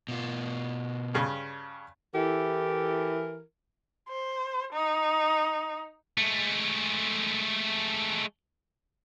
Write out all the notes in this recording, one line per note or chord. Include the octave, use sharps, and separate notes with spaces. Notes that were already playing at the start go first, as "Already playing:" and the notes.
B2 F4
G2 C#3
E3 E4 G4 A4 A#4
C5
D#4
G#3 A3